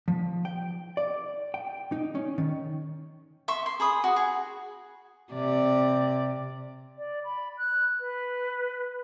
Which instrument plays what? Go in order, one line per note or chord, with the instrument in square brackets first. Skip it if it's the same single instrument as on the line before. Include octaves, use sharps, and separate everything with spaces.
[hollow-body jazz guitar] F3
G5
D5
G5
D#4
C#4
D#3
[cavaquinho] E5 C6 C#6
C6
G#4 B5 D#6
F#4
G#4
[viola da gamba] C3 D5
[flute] D5
B5
F#6
B4